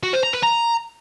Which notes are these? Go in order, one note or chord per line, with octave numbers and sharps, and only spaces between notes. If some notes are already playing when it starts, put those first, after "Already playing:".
F#4
C5
A#5
B4
A#5